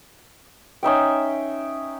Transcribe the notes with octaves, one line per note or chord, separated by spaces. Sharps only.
C#4 D#4 E5 G5